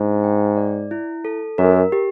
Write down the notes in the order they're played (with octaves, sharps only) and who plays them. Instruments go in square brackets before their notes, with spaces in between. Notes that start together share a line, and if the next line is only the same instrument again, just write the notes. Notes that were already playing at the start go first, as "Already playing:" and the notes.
Already playing: [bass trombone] G#2 [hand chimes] D4
[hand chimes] G5
D5
E4
A4
[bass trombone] F#2 [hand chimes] A#4
[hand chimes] G4